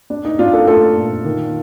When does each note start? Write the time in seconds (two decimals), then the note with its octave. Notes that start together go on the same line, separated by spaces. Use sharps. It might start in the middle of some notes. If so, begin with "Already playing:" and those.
0.10 D4
0.25 D#4
0.39 D4 F4
0.53 F4 A4
0.67 A3 F4 A4
0.96 A#2
1.25 D#3